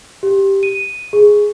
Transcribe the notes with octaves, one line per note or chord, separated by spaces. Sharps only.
G4
D#7
G#4